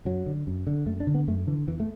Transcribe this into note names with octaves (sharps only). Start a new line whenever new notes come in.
F#2 F#3
D3
F#2
D3
F#2 A3
D4
D3
B3
F#2 A3
D3 E3
E2 E3
A3